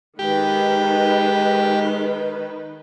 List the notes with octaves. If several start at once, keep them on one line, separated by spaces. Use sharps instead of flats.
D#3 G#3 G4 B4